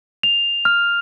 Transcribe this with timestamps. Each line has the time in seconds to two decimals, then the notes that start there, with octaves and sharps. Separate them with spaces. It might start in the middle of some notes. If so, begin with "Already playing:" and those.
0.23 F7
0.65 F6